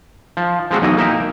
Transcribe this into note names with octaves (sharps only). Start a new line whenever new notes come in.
F3
F3 G#3 C4 F#4
B1 B2 E3 F#3 D#5
A#3 D#4 E5 G5